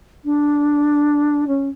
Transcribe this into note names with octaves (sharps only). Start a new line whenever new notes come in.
D4
C#4